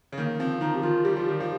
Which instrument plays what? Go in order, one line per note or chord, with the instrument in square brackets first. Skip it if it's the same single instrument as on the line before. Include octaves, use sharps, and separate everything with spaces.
[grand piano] C#3
[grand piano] D#3 [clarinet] A#3
[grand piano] F3 [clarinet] C4
[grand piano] D#3 [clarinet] D#4
[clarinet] G4
[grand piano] D#3 [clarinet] F4
[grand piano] G3 [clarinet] G4
[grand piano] F3 [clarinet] F4
[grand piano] D#3 [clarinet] G4
[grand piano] F3